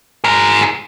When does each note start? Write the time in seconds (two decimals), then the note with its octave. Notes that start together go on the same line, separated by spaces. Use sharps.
0.24 G#4 A#4